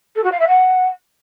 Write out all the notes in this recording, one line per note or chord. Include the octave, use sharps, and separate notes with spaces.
A4
F#4
F5
E5
F#5